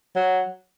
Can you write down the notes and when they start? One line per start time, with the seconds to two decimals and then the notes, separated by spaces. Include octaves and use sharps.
0.16 F#3